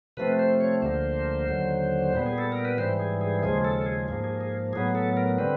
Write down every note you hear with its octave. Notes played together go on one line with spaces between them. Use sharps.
C3 F3 A3 C4 B4
C5
C#5
D2 D3 F3 A#3 C5
D#2 D3 F#3
A#2 G3 B3
G#4
A4
A#4
B4
G#2 E3 G3 C5
G#4
G#4
D#2 C#3 F3 G#3 G#4
A4
A4
G#4
G#2 F3 A#3 G#4
G#4
G#4
A2 F#3 B3 G#4
A4
A#4
D3 G3 C4 B4